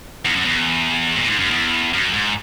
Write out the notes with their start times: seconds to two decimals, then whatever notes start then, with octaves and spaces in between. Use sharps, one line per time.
0.25 E2
0.35 F#2
0.45 E2
1.16 A#2
1.27 G#2
1.39 F#2
1.51 E2
1.93 F#2
2.14 G#2